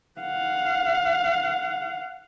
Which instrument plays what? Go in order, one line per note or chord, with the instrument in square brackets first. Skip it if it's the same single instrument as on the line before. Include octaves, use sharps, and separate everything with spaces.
[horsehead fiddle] F5 F#5